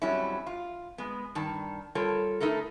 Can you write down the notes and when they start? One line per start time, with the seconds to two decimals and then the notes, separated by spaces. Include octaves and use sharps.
0.02 F2 F#3 G3 C#4 E4
0.47 F4
0.98 G#3 B3
1.35 G2 D#3 A5
1.95 G3 F4 A4 A#4 C#5
2.41 A3 D#4 E4 A4 A#4